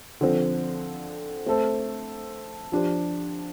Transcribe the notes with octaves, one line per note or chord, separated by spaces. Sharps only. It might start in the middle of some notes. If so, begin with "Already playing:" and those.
D3 F3 C4
A3 C4 A4 C5
F3 D4 G4 C5